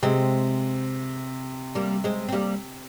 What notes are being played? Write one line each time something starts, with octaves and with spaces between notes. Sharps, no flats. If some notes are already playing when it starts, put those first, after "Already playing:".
C3 G#3 C4
G3 A#3
G#3 C4
C4
G3 A#3